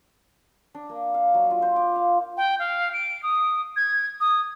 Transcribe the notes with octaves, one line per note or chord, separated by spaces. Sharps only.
D4
A#3
F5
F#3
F4
C5
D6
F5
G5
F5
D7
D#6
G#6
D#6